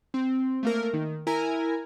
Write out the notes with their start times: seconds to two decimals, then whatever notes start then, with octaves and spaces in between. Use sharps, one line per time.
0.14 C4
0.63 A3 A#3 A#4
0.93 D#3
1.27 E4 A#4 G#5 A#5